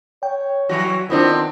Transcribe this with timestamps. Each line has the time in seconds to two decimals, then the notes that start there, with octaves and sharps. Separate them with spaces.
0.23 C#5 G5
0.69 E3 F#3 F#4
1.10 D#3 B3 C4 D4 E4 F4